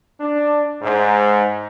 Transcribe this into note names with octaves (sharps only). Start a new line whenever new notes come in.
D4
G#2